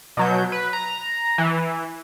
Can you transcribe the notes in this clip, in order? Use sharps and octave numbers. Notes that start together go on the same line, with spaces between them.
B2 F#3 G6
B4
A#5
E3